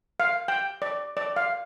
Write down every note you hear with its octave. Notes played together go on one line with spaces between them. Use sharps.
F5
G5
D5
D5
F5